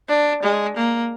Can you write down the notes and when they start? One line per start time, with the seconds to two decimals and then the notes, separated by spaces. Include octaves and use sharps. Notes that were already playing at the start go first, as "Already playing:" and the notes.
0.09 D4
0.43 G#3
0.76 A#3